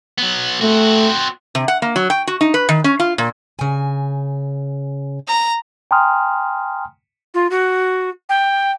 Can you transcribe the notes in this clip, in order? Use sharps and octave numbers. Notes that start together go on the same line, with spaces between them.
F#3 B3
A3 C4 F#4
C3
F#5
A#3
F#3
G5
F#4
D#4
B4
D#3
C#4
F4
A#2
C#3 G#5
A#5
G5 G#5 A#5 C6 D#6 F6
F4
F#4
G5